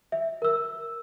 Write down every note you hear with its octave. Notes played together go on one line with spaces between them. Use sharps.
E5
A#4 E6